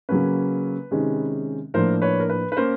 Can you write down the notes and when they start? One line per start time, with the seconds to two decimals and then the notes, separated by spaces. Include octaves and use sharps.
0.09 C#3 F#3 A#3 C#4 B4
0.91 C3 D#3 G#3 C#4
1.74 A2 F3 A#3 D4 A#4 C5
2.02 B4 C#5
2.20 A#4
2.29 B4
2.52 B4
2.57 A#3 C#4 A#4 C5